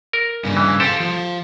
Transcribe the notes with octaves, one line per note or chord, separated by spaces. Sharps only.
A#4
G2 C#3
E3
G4 A4 C5 F5
F3